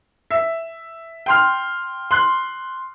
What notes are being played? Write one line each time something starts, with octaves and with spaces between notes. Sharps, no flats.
E5
G5 C6 F6
C6 F#6